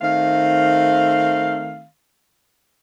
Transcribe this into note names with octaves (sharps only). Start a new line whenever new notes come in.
D#3 A3 C4 F5